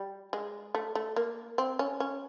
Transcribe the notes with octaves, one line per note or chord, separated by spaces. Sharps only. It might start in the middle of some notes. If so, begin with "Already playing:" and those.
Already playing: G3
G#3
A3
A3
A#3
C4
C#4
C#4